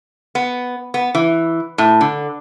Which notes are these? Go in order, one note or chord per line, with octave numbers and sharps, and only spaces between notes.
B3
B3
E3
A2
D3